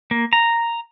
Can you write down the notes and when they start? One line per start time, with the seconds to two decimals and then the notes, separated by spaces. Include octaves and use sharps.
0.11 A#3
0.33 A#5